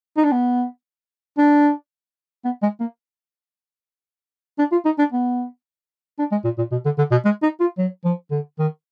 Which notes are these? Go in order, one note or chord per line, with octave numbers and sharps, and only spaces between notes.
D#4
D4
B3
D4
B3
G#3
A#3
D4
F4
D#4
D4
B3
D4
G#3
A#2
A#2
B2
D3
D3
B2
G#3
D#4
F4
F#3
F3
D3
D#3